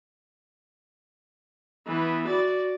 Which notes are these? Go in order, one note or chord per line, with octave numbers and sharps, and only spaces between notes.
E3 B3
F#4 D5